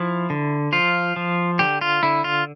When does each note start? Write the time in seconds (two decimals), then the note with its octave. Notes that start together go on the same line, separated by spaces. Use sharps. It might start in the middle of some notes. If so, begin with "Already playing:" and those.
Already playing: F3 E4
0.30 D3
0.72 F3 F4
1.16 F3
1.59 D3 G4
1.81 F4
2.03 D3 E4
2.24 F4